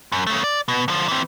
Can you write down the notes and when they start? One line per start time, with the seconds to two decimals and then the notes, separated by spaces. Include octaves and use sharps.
0.12 F#2
0.27 C#3 A3
0.44 D5
0.68 B2
0.88 D3 F3
1.08 E3 C4